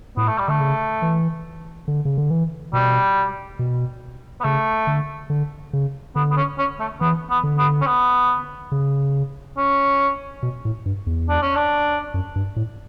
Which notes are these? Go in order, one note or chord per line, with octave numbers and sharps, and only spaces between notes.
A2 B3
A3
G3
D3 A3
C#3
E3
D3
C#3
D3
E3
B2 G3
B2
B3
C#3 A3
D3
D3
C#3
D3 B3
B3
C#4
C#4
A3
E3 B3
B3
D3
B3
C#4
B3
C#3
C#4
B2
A2
G2
E2
D4
C#4
D4
F#2
G2
A2